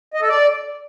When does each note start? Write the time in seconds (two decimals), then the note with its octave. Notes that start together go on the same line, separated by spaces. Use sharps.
0.14 D#5
0.21 A4
0.29 D5